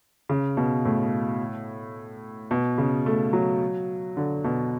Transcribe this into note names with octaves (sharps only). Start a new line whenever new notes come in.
C#3
B2
A2
B2
C#3
A3
F#3
D3
B2